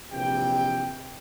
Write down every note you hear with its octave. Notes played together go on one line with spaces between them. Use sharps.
A#1 C3 E3 G4 G5